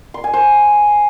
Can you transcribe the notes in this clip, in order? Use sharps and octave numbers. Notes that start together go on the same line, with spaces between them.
C6
G#5
C5